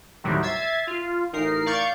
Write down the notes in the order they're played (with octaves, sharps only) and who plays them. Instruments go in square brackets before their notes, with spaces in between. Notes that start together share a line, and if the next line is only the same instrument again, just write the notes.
[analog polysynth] D#2 A2 C3 D#3 F#3 G3
E5 G#6 A6 C7
F4
A1 D#4 A#4 C7
D5 F5 C#6 G6 A6 C#7